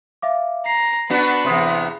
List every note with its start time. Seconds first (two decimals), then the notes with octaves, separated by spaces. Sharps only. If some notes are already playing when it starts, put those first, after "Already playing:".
0.22 E5 F5 D6
0.66 A#5 C7
1.10 B3 D4 F#4 B4
1.45 E2 C3 C6 D#6